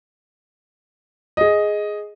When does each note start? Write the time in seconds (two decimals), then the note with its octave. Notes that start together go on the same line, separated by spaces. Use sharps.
1.37 G#4 D#5